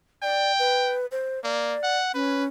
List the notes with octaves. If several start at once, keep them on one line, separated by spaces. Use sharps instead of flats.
D5 G5
B4
C5
A#3 D5
F#5
C#4 B4